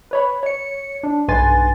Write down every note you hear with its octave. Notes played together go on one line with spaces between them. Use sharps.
B4 C#5 B5
C#5 C#7
D4
B1 G2 B4 G#5 C6 A6